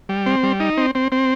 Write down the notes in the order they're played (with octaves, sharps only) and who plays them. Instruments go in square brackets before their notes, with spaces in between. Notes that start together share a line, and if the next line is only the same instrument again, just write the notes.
[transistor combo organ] G3
C4
G3
D#4
C4
C4
C4